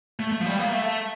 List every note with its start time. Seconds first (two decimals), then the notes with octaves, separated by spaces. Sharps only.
0.19 A3
0.32 A3
0.41 F3
0.46 G3
0.59 A#3
0.72 A3